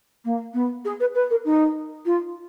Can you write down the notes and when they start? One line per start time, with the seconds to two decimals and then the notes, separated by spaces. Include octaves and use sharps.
0.24 A#3
0.53 B3
0.85 G#4
1.00 B4
1.14 B4
1.30 A#4
1.45 D#4
2.05 F4